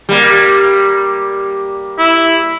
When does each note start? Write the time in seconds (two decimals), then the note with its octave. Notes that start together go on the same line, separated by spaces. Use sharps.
0.09 G3 A#3
1.99 E4